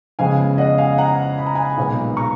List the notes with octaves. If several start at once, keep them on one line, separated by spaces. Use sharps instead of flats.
F2 C#3 G#3 B3 F5 G#5
D#5 F#5
F5 G#5
F#5 A#5
B5
A#5
G#5 B5
B1 A#2 G#3 B3
A#5 C#6